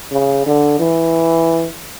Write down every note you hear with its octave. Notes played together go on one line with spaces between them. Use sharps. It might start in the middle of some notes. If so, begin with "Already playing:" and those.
C#3
D3
E3